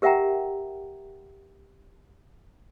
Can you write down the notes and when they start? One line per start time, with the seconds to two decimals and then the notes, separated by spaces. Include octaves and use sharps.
0.02 G4 A#4 E5 F#5 G5 A#5